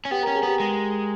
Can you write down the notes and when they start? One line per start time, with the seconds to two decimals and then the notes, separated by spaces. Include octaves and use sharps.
0.05 C#4
0.11 B3 G4 G5
0.23 C#4 A#4 A#5
0.35 G#4 G#5
0.43 B3 G4 G5
0.60 G#3